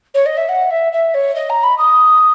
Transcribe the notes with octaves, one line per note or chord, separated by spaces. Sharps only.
C#5
D#5
E5
F#5
E5
E5
C#5
D#5
A#5
B5
D#6